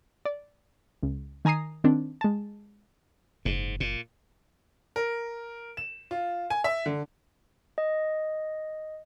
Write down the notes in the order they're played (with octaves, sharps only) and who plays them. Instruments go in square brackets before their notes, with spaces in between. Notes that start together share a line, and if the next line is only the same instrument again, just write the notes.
[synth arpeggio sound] D5
C#2
D#3 G#5 A#5 D#6 C7
D#3 C4 D4
G#3 A5
[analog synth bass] F#1 [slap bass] G#2
[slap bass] A#2
[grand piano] A#4
E7
F4
G#5
E5
D3
[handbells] D#5